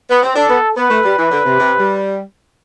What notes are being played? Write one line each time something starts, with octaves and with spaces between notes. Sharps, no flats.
B3
C4
D4 A4
B3
B3 B4
A3
G3
E3
D3
C3
C3
G3